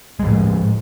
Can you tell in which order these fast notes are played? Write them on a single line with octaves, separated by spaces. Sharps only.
G#3 F3 A2